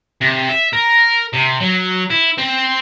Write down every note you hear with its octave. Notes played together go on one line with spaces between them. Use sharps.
C3
E5
A#4
C3
F#3
E4
C4